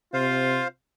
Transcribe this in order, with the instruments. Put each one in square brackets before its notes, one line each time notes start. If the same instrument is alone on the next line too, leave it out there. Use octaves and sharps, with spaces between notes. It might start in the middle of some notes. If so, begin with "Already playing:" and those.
[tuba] C3 [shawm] F4 [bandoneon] C5 F5